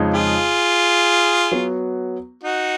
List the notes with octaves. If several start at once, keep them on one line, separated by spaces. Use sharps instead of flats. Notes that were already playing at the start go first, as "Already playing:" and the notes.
Already playing: F2 C#3 G#3 D#4
F4 G#4
F#3 B3 F#4
D#4 F#4